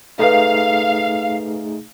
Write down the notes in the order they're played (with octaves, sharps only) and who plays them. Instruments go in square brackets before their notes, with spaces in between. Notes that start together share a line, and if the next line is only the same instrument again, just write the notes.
[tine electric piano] A3 D#4 G#4 [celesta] A4 B4 [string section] F5